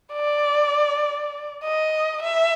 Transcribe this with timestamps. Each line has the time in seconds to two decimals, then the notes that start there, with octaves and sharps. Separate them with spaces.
0.13 D5
1.63 D#5
2.23 E5